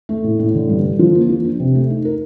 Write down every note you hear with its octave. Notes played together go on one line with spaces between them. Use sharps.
A3
A2
A2
D3
G2
D3
F3
A#3
F3
D4
C3
A3
D#4
A#4